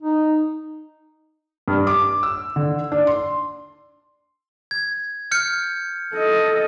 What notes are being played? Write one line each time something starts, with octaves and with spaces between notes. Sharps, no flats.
D#4
G2
D6
E6
D3
D4
C6
G#6
F6 G6 C#7
A4 D#5